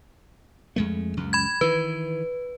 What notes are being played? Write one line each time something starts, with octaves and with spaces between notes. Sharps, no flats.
F2 G#3 A3
C#2 F#2
B5 G#6
D#3 E3 B4